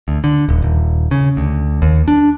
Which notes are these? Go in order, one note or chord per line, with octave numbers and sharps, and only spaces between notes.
D2
D3
D#1
D#1
C#3
D2
D#2
D4